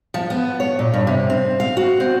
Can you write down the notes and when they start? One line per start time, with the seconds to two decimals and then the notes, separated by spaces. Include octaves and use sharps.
0.14 F3
0.30 B3
0.60 C#5
0.79 A#2
0.94 G2
1.07 C3
1.30 C4
1.60 F5
1.77 F#4
2.00 C4